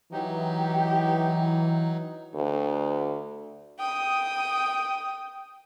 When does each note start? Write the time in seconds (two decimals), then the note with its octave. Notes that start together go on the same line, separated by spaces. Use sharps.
0.12 E3 F#3 D#4 G4
2.35 D2
3.79 G5 D#6